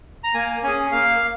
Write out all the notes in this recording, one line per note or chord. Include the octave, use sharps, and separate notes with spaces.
A#5
A#3 G#5
C#4 G#4 G#5
A#3 F5